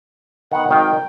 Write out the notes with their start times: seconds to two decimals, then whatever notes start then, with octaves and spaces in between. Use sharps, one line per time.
0.52 D#3 B3 F#5
0.69 G#1 D#3 F5 G5